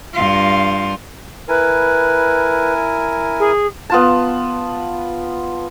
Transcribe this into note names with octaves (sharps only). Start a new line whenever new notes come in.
G2 F4
E4 A#4 B4 G#5
G#4
B3 F4 A5